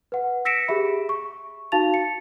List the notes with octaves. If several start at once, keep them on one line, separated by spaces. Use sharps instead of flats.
B4 F#5
E6 A#6 B6 C#7 D7 E7
G4 G#4 E5 B5
C#6
D#4 F#4 F5 A5 A6 F7
C#7